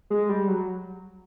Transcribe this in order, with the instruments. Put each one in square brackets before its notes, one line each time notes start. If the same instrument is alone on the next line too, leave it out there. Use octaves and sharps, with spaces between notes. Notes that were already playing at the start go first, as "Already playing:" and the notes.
[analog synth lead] G#3
G3
F#3